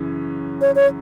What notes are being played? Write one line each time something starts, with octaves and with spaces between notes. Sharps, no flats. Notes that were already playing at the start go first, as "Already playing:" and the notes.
Already playing: F#2 C#3 E3 C#4
C#5
C#5